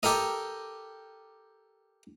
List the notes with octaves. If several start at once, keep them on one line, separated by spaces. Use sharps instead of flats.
G4 A4 A#4 D#5